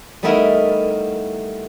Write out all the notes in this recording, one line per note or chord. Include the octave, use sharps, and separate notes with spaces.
G3 A3 B3 D#4 E4 A#4